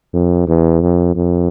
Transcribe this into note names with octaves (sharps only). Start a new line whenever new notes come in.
F2
E2
F2
F2